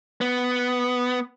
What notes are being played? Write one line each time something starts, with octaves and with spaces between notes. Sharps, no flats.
B3